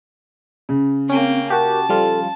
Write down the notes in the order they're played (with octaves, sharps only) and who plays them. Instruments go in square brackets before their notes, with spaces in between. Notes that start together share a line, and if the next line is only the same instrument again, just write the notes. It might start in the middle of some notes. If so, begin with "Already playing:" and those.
[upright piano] C#3
[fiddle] A#3 G5 [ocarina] C4 [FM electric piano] C#4
[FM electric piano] F#4 G4 [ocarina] A#4 [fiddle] A5
[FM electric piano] F3 G3 F4 [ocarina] A4